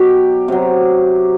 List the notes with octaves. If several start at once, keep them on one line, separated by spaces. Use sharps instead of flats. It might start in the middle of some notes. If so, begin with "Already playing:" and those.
Already playing: B2 F#3 G4
C3 F#3